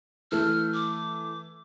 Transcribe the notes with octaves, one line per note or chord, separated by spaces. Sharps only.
E3 A3 F6
D6